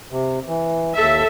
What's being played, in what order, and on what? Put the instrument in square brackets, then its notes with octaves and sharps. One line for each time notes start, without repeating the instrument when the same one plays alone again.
[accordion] C3
E3
[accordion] D#2 [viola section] A4 E5